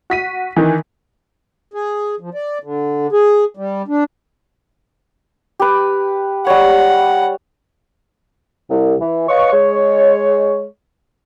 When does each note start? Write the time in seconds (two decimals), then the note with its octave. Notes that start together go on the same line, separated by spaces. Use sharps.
0.10 F#4 B6 D#7
0.56 D#3 E3
1.74 G#4
2.20 F3
2.34 D5
2.64 D3
3.12 G#4
3.57 G3
3.88 D4
5.60 G4 B4
6.47 G3 C#5 F#5
8.71 C2
9.00 E3
9.28 B4 C#5 D#5 F5 C#6
9.53 G#3 C#5